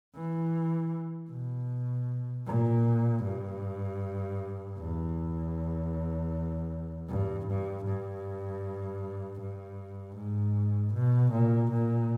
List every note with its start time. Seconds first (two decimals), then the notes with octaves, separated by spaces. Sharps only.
0.15 E3
1.30 B2
2.46 A#2
3.23 G2
4.78 E2
7.09 G2
7.47 G2
7.86 G2
9.40 G2
10.17 G#2
10.94 B2
11.32 A#2
11.72 A#2